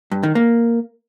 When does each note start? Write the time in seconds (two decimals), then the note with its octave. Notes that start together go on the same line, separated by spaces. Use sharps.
0.11 G2
0.23 D#3
0.35 A#3